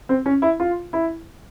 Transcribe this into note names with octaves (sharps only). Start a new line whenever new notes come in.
C4
C#4
E4
F4
E4